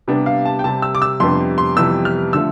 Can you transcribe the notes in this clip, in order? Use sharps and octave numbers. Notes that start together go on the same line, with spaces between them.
C3 G3 B3 D4
F5
A5
G5
C3 G3 C4 A5
E6
D6
E6
F2 C3 G3 B3 D4 C6
C6
F2 C3 E3 G3 B3 E6
F6
D3 F3 A3 E6